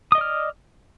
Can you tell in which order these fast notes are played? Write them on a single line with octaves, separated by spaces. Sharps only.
D#6 D#5 D5 F6